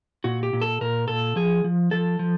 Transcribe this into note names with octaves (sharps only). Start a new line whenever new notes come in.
A#2 F#4
G4
A#2
A4
A#2 A#4
A#2 A4
F3 G#4
F3
F3 A4
F3